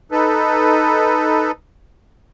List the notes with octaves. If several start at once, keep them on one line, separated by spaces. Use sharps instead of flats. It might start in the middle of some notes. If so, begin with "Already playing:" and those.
D#4 A4 B4